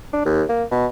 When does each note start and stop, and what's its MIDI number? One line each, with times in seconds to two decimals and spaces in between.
0.13 0.24 62
0.25 0.43 39
0.49 0.64 58
0.71 0.87 47